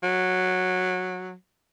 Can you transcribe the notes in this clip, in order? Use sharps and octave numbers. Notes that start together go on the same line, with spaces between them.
F#3